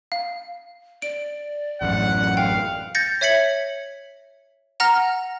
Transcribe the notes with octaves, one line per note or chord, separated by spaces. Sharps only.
F5
D5 D7
A1 F#2 F#5
F5 G5
G6 A6 A#6 C#7
C#5 E5 G#6 B6 C#7 F#7
F#5 A#5 F6 A#6